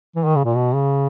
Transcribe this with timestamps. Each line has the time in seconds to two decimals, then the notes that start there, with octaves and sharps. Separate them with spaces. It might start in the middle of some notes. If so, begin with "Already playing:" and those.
0.16 E3
0.25 D#3
0.36 C#3
0.44 A#2
0.55 B2
0.74 C#3